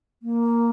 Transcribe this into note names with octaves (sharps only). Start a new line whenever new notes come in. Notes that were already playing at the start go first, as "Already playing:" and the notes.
A#3